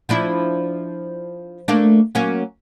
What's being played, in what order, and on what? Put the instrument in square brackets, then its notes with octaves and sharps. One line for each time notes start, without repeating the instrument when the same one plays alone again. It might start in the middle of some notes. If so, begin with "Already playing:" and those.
[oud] F3 D4 E4
A3 A#3 D4
F#3 A#3 C#4